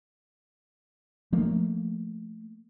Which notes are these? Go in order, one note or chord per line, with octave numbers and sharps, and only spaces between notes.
F3 A3 A#3